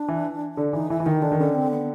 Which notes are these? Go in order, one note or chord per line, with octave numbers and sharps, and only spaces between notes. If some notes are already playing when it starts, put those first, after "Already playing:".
Already playing: D4
E3
D3
E3 D#4
E3 E4
E3
D#3 D#4
D3 D4
D#3
D3 C#4
C4
B3